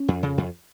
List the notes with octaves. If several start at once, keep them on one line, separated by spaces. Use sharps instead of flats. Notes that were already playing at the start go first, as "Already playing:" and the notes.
Already playing: C#4
F2
C#3
F2